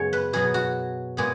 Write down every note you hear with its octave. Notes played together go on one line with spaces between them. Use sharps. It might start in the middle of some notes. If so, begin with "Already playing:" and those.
Already playing: F#2 C#3 G#3 B3 G#4 C#5
B4
B2 F#3 B3 G#4
F#4
A#2 G#3 B3 G#4